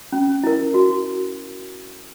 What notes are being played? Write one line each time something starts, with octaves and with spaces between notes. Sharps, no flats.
C#4
E4 A#4
F#4